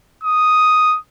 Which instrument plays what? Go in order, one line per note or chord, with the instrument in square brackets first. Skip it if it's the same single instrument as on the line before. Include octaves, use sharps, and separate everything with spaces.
[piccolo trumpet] D#6